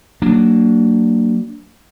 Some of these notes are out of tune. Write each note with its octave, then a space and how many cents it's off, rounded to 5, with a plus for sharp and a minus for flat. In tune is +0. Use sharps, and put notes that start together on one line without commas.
F#3 +20 A#3 -20 D4 +0